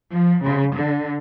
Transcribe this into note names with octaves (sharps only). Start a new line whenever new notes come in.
F3
C#3
D3